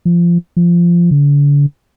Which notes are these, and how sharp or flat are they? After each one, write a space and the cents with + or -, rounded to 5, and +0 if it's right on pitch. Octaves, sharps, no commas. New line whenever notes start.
F3 -20
F3 -15
D3 -40